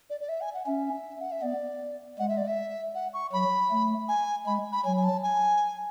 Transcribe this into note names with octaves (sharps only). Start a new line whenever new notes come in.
D5
D5
E5
G#5
F#5
C#4 E5
F#5
E5
B3 D5
G#3 F#5
E5
D5
E5
F#5
C#6
F#3 B5
A3
G#5
G#3 B5
B5
F#3 G#5
G#5
A5
G#5